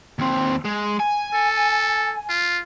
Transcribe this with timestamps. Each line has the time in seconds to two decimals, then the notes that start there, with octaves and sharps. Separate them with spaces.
0.19 D#2 C4
0.65 G#3
1.00 G#5
1.34 A4
2.29 F4